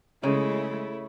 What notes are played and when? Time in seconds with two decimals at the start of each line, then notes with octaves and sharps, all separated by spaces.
0.23 C#3 G#3 A3 E4 C#5